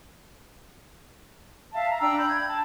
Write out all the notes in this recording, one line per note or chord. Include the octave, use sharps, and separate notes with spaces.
E5 F5 A5
A#5
D4 G5 A#5 E6
B5 G6
G#6
A5